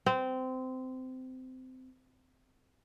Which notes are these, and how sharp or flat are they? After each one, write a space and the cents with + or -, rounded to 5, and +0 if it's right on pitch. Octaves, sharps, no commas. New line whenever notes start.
C4 -20